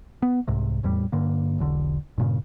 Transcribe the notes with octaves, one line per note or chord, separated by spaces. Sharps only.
B3
C2 G#2 C3
F1 E2 A2 G3
G2 D3 A#3
E1 B1 D3
G2 A#2 C#3